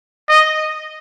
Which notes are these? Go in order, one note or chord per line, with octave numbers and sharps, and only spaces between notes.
D#5